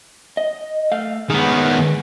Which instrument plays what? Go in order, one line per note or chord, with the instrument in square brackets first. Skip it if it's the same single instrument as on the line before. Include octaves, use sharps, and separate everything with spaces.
[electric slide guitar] D#5
A3 F5
[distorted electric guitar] D#3 B3 [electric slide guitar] G#3 G#4